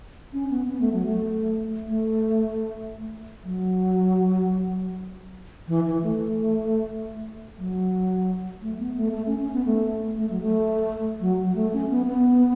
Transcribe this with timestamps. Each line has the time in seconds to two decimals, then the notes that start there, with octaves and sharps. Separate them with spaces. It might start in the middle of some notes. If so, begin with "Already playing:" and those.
0.33 C#4
0.50 B3
0.68 B3
0.81 A3
0.93 F#3
1.06 A3
1.88 A3
3.44 F#3
5.68 E3
5.86 E3
6.03 A3
7.59 F#3
8.62 A3
8.79 B3
8.96 A3
9.13 A3
9.26 C#4
9.39 C#4
9.53 B3
9.65 A3
10.17 A3
10.30 F#3
10.42 A3
11.20 F#3
11.46 F#3
11.55 A3
11.73 C#4
11.90 B3
12.07 B3